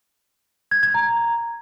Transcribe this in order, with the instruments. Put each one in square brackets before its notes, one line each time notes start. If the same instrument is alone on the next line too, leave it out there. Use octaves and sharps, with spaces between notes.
[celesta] G#6
G#6
A#5